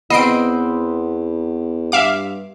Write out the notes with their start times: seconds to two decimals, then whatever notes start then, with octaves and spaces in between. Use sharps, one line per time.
0.10 E2 B3 C4 D#5 C7 D7
1.92 G2 E5 F5 D6